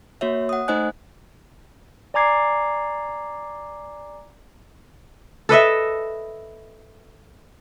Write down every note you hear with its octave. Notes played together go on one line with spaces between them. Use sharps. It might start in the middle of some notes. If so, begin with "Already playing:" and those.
A#3 F#4 C#5 E5
F#5 D#6
A3 D#4 C5 D#5 G#5 F#6
D5 G#5 A#5 D6 G#6 C7
A4 B4 D#5 E5